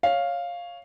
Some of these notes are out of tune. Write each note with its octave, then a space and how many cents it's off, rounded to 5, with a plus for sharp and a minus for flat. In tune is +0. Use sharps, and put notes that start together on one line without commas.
C#5 +0 F5 +0